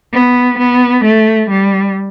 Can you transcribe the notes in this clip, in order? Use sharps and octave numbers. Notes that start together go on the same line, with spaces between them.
B3
B3
A3
G3